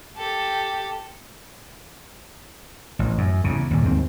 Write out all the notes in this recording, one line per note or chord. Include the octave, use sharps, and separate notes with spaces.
G4 A4
A1
F#2
E2 C#3
D#2 A#2
D#2 G#2 C4